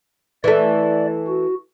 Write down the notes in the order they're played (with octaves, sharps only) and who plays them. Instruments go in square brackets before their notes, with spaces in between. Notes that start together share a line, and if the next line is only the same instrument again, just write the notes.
[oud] E3 A3 [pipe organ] D5
[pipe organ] F#4